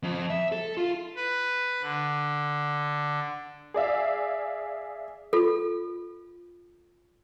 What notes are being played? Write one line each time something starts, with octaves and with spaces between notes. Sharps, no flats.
F2
E5
A4
F4
B4
D3
G#4 D5 E5 F5
F4 A4